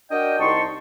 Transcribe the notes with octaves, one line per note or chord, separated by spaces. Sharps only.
D4 F#4 A#4 D#5 G5
C2 D#4 A5 C6 C#6